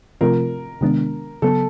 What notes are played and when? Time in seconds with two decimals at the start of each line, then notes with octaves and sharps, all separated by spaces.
0.21 C3 F3 A3 C4 F4 A#4
0.81 C3 D#3 G#3 B3 D4
1.42 C#3 F#3 B3 A4